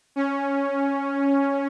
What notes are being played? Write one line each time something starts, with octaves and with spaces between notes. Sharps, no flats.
C#4